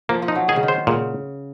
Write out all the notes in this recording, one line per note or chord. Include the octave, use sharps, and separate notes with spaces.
F3 A#3
F3
D#4
F#3
D#3 G#4
C#3
D#3
C5
A#2 C#3